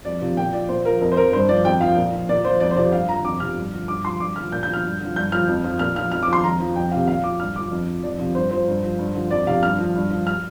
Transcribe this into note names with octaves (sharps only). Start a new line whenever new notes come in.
F2 D5
C3 F3
A#2 G5
F3 D5
A#2 C5
F3 A#4
F2 A#4
C5
F3 A#4
G2 C5
F3 D5
F2 G5
F3 F5
A#2
F3
A#2 D5
F3 C5
F2 D5
C5
C3 F3 D5
G2 F5
D3 F3 A#5
F2 D6
C3 F3 F6
G2
D3 F3
G2 D6
F3 C6
G2 D6
D3 F3 F6
A#2 G6
G6
F3
F6
G2
D3 F3
G2 G6
F3 F6
F2
F3
A#2 F6
F3 F6
F2 F6
F3 D6
C6
F2 A#5
F3
F2 G5
C3 F3 F5
A#2 F5
F3 D6
G2 F6
D3 F3 D6
F2
F3
F2 D5
C3 F3
G2 C5
F3 C5
G2
F3
G2
D3 F3
F2 D5
C3 F3 F5
G2 F6
F3
G2
F3
F6